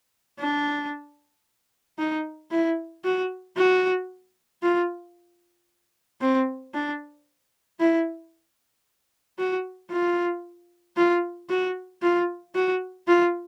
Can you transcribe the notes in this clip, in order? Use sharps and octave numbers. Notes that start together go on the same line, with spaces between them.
D4
D#4
E4
F#4
F#4
F4
C4
D4
E4
F#4
F4
F4
F#4
F4
F#4
F4